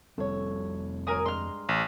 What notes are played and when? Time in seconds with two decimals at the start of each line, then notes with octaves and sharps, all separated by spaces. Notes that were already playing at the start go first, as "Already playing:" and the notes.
0.18 F1 G3 C4 A4 C#5
1.07 G#2 F#3 A#4 G#5 D#6
1.26 G2 G#3 A#5 C6 F6
1.69 A1